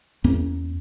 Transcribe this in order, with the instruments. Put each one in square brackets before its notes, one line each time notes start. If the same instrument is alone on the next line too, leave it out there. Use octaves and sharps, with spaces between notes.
[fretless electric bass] E2 A#3 C#4